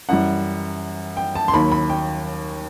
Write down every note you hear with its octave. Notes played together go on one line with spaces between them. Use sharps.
F#2 E3 G3 F#5
G5
A5
C6
D#2 D#3 F#3 B5
B5
G5